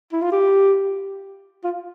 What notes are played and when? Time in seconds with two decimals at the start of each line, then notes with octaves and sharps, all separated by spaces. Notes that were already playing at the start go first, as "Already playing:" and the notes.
0.13 E4
0.22 F4
0.32 G4
1.64 F4